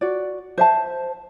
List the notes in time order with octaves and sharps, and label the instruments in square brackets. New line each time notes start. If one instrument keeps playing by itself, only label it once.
[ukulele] F#4 D5
C5 E5 A5